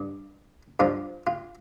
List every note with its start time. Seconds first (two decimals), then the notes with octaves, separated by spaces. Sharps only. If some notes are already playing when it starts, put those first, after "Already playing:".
Already playing: G2
0.80 G2 F3 F4
1.27 F4